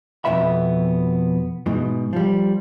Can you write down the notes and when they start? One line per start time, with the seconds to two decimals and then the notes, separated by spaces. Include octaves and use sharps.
0.25 F2 B2 B3 E5 B5
1.66 G#2 B2 E3
2.13 F3 G3